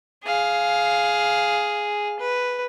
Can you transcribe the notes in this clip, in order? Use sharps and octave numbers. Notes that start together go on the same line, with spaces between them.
G#4 F5
B4